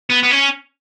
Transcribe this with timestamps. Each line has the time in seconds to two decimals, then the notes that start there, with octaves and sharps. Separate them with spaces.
0.10 B3
0.23 B3
0.31 C#4